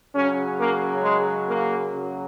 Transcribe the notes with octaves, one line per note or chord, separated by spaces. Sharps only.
C#3 F#3 C#4
A#3
G#3
A#3
C#3 F#3